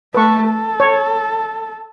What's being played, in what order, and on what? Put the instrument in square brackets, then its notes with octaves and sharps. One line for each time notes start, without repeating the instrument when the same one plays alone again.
[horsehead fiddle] A3 A4 [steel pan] B4 C#6
[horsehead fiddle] A4
[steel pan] C#5